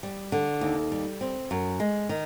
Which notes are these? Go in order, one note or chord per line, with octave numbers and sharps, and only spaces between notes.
G3
D3
D#2
G3
C4
F#2
G#3
D#3